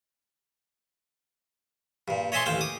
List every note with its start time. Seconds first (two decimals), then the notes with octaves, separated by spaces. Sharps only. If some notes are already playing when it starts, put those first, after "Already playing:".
2.08 G2 A#2
2.32 C#5 D#5 E5 G#5 A5 C6
2.46 A1 D#2 C5 F5 G5
2.61 D6 D#6